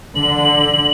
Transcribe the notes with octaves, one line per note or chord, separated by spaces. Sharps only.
D3 F#7